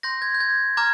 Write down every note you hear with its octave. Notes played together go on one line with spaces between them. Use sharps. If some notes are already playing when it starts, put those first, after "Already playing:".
C6 G6 A#6
G#6
G6
G#6
A#5 D6 F6 G#6